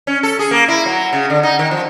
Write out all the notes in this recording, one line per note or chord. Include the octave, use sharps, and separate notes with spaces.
C#4
A4
G#4
A#3
E4
F#3
C#3
D3
D#4
D#3
F3